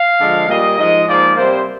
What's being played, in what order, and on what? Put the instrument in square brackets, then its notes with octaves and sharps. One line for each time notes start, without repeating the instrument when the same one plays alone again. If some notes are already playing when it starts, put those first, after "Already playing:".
Already playing: [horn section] F5
D3 F3 G#3
A#2 G3 A#3 D#5
G#2 F3 G#3 D#5
G#2 F3 A#3 D5
C3 G3 A#3 C5